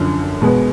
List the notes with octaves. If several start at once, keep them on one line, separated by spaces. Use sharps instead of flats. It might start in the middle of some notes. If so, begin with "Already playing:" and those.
Already playing: F#2 D3 F3
B2 G#3 B3